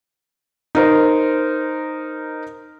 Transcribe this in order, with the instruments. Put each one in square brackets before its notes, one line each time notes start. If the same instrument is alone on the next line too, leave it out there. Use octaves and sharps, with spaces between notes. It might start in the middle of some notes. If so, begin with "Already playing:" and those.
[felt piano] D#4 A#4 C5